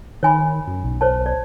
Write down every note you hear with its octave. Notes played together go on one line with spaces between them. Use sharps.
D#3 C#5 G#5 B5
F#2
B1
C5 C#5 A5
D5